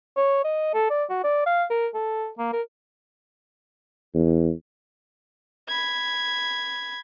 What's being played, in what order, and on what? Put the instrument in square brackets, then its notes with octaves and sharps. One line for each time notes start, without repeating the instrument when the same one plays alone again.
[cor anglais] C#5
D#5
A4
D5
F#4
D5
F5
A#4
A4
A#3
A#4
[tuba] E2
[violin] B5 G#6